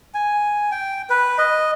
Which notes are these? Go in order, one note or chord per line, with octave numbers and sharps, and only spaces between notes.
G#5
G5
B4
D#5